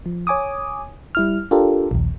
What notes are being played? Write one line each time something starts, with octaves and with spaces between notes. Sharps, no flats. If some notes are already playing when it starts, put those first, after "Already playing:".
F3
C#5 G#5 D6 D#6
G3 E4 F6
D4 F4 G4 A4 A#4
A#1 D#2